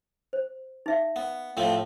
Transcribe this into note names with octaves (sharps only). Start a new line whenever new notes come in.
C5
D#4 E5 F5
B3
A2 F3 C4